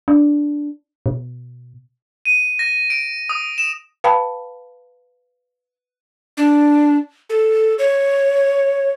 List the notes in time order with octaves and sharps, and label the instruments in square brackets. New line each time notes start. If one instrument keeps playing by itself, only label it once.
[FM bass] D4
B2
[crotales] D#7
A#6
D7
D#6
E7
[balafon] B4 F5 G5 A5 B5
[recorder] D4
A4
C#5